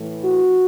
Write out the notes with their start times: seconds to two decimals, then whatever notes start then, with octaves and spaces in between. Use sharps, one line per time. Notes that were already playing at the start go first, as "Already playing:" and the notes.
Already playing: A2 E3
0.22 F#4